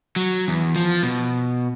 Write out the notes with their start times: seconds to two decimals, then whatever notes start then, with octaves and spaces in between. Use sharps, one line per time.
0.16 F#3
0.48 E2
0.76 F3
1.03 B2